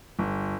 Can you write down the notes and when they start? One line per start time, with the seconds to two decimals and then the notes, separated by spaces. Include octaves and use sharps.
0.19 G1